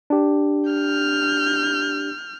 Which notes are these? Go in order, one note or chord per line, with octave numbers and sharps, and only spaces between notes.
D4 G4
F6 G6